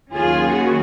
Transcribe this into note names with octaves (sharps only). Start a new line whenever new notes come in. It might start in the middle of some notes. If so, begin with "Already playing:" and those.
D#2 D#3 F#3 C#4 F4 G#4
F#4